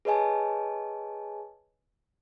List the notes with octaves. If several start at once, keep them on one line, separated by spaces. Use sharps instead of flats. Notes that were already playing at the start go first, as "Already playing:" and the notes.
G#4 B4 C#5 D#5 G#5 A5